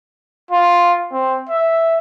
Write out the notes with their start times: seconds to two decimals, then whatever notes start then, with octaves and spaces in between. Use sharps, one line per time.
0.51 F4
1.12 C4
1.49 E5